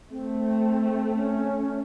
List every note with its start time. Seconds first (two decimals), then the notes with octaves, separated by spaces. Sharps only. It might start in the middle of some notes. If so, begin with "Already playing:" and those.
0.10 A3 C4
1.17 C#4